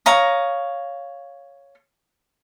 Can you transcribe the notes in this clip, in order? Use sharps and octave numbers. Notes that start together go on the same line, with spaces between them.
C#5 F5 A#5 D#6